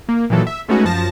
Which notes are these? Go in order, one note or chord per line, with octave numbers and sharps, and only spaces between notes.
A#3
A#2 D#3 E3 F#3 A4
E5
G#3 A3 B3 C#4 D#4 F#4
F#2 F3 A5 A#6